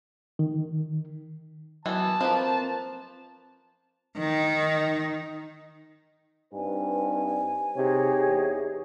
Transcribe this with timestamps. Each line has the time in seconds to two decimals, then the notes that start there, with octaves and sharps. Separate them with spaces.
0.39 D#3
1.86 E3 F#3 B3 A5
2.21 F3 A#3 C4 B4 C5
4.18 D#3 D#4
6.53 G2 C4 D#4 B4 G#5
7.76 C3 D#4 G4 G#4 C#5
8.27 E2